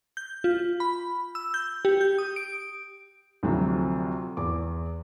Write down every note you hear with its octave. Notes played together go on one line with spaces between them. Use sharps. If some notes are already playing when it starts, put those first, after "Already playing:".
G6
F4
B5
E6
G6
G4
G6
D#6
D7
D2 C3 F3 F#3
E2 D6